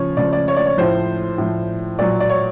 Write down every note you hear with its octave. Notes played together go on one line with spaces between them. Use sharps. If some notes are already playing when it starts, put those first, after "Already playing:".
Already playing: C#3 F3 C#5
C#3 F3 D5
D5
C#5
D5
C#5
A2 F3 C5
A2 F3
A#2 F#3 D5
D5
C#5